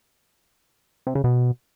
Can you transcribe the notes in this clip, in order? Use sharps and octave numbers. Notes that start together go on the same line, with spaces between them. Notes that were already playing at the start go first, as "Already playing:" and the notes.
C3
C#3
B2